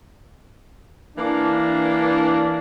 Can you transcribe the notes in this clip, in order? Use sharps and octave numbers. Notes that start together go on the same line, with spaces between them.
E3 A#3 D4